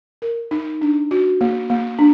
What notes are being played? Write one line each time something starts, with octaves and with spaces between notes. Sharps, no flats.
A#4
D#4
D4
F#4
A#3
A#3
D4